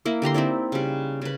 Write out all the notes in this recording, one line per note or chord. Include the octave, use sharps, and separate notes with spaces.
A#3 E4
D3 G4 A#5 C6
C4 D#4 E4 D5
C#3 G3
C#3 B4